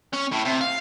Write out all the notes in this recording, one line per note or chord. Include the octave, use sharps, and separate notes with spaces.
C#4
A2
C3
F5